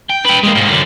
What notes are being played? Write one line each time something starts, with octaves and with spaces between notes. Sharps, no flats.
G5
B4 G5
G#3 A#3
G#2 A#3
F#2 D3